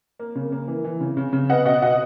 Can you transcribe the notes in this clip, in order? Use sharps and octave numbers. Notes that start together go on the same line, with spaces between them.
A#3
C#3
A#3
E3
E3
C#3
C#3
C#3
B3 D#5 F#5
B2 D#5 F#5
B2 D#5 F#5